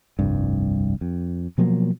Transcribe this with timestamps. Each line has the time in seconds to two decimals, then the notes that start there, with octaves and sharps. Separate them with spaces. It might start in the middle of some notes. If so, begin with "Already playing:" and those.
0.19 F1 C2 G2
1.01 F2
1.58 B2 F3 F#3 A#3